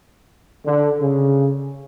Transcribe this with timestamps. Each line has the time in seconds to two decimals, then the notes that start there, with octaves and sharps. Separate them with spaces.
0.66 D3
1.00 C#3